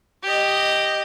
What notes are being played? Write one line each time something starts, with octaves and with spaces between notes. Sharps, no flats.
G4 D#5